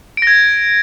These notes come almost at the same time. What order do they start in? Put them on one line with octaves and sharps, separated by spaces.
D7 A#6 G#6